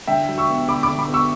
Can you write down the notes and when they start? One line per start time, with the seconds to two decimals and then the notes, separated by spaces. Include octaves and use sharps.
0.07 D3 E5 G5
0.28 F#3
0.38 C#6 E6
0.49 B3
0.68 D3 B5 D6
0.83 B5 D6
0.88 D3
0.99 B5 D6
1.09 B3
1.14 C#6 E6